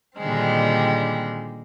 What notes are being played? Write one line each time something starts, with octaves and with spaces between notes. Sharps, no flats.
A#2 D3 D#3 G3 G#3 C4